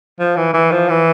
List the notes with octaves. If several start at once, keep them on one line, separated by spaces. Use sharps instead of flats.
F3
E3
E3
F3
E3